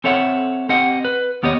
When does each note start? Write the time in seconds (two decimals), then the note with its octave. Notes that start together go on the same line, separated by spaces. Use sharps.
0.04 C4 A4 C#5 E5 F#5
0.69 C4 G4 D#5 F#5
1.05 B4
1.43 D#2 B3 G4 C#5 D#5